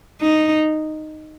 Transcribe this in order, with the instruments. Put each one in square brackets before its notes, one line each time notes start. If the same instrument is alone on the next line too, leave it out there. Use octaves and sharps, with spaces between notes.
[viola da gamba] D#4